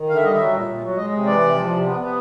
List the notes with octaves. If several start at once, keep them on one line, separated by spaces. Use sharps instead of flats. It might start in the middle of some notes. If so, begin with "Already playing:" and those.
Already playing: D#3
D3 F5
E5
G3 D#5
F#3 E5
A#2
A#2
F#3
G#3 D#5
C3
E3 D5
C3
F3
C3
B3
B3